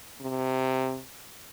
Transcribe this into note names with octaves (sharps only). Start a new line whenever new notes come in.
C3